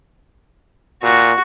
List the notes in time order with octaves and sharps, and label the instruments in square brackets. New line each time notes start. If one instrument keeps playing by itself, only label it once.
[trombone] A#2 [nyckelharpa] F#4